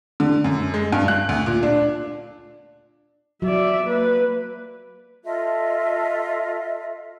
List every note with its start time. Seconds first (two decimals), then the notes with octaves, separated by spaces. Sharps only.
0.20 D3
0.44 F#2
0.74 G#3
0.92 G2
1.08 F#6
1.29 D2
1.46 A#2
1.63 D4
3.42 F#3 D5 E5
3.86 A#3 B4
5.25 F4 A4 D#5 E5